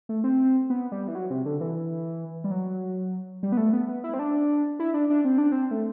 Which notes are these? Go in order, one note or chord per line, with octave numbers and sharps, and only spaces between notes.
A3
C4
B3
G3
E3
F#3
C3
D3
E3
G3
F#3
G3
B3
A3
B3
B3
E4
C4
D4
E4
D4
D4
C4
D4
C4
A3